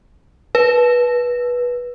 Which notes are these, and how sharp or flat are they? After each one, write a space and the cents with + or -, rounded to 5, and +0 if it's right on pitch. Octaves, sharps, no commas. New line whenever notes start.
B4 -20